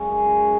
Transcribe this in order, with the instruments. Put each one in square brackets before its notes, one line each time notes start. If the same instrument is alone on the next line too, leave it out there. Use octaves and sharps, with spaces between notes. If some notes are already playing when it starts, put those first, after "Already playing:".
Already playing: [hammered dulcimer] F#2 C#3 G#3 C#4 F#4
G#4
F#4